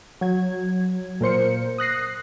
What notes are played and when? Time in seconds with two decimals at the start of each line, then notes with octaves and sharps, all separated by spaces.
0.21 F#3 G#6
1.21 A#2 A#4 C5 C#7
1.78 D#6 F#6 A#6 C7